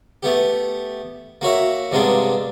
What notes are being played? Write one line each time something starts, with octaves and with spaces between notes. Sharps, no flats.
A3 B3 G4
A#3 F#4 C#5 E5
G2 C3 G#3 A#3 B3 D4